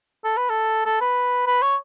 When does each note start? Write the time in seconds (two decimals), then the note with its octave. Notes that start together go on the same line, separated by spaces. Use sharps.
0.24 A4
0.37 B4
0.50 A4
0.86 A4
1.01 B4
1.47 B4
1.62 C#5